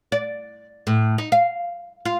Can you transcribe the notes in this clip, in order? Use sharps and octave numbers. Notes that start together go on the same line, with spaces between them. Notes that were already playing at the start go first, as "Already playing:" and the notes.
D5
A2
D#4
F5
F4